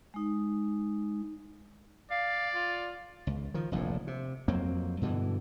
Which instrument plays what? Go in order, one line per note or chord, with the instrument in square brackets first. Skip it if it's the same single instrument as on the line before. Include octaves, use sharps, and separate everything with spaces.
[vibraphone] G#3 D#4
[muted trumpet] D5 [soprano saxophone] F5
[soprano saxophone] F4
[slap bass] C#2
D#3 F3
F1 A#1 E2 A2
C3
F2 F#3 A#3 C4
G2 B2 D3 E3